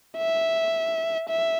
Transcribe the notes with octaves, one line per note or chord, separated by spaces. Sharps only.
E5
E5